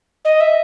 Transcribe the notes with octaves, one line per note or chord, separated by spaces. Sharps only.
D#5
E5